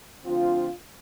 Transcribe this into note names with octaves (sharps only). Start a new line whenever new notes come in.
D2 D3 F3 C4 F4